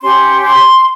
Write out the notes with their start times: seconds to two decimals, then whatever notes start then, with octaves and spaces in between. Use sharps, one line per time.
0.01 C#4 G4 C#5 C6
0.42 C6